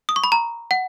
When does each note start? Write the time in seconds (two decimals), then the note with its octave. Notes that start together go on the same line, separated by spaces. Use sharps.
0.09 D#6
0.16 C#6
0.24 B5
0.32 A#5
0.71 F#5